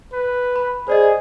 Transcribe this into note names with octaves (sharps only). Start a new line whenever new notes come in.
B4
B5
G#4 C5 D5 D#5